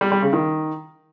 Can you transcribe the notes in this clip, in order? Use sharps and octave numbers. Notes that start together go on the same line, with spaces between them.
G3
G3
C#3
D#3